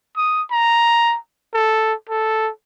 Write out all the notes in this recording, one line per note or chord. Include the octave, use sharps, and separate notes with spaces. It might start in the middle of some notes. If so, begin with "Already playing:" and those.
D#6
A#5
A4
A4